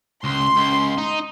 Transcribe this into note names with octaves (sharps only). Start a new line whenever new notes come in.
C#2 C6
C#2
D#4